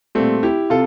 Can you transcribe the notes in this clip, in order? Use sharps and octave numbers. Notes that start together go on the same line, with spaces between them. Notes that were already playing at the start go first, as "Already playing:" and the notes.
A#2 G3 A3 C4
E4 G4
C3 F4 A4